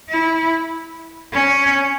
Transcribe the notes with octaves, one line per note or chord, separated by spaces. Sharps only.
E4
C#4